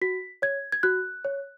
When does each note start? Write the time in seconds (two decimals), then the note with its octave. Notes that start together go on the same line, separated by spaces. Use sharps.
0.01 F#4 B6
0.42 C#5 G#6
0.72 G#6
0.83 F#4 F#6
1.25 C#5